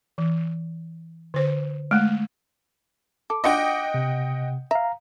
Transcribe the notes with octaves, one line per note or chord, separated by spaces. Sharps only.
E3
D3 C5
G#3 A3
A4 D6
D4 F4 F#4 D#5 F#5 G5
C3
E5 F5 A#5